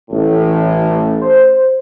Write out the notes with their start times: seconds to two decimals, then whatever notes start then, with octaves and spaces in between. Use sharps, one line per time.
0.11 A1 A2
1.21 C5